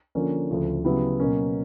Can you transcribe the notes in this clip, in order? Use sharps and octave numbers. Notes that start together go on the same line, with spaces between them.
D3 F3 A#3 C#4
D2 C#3 F3 A3
C#3 F#3 B3 E4 G4
B2 F#3 A#3 C#4